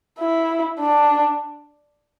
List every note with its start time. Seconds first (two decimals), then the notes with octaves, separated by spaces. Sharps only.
0.20 E4
0.80 D4